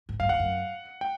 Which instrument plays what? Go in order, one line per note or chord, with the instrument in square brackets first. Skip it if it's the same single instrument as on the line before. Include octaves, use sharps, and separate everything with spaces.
[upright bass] G#2
[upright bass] G2 [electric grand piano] F5
[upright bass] F2 [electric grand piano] F#5
[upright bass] F#2
[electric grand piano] G5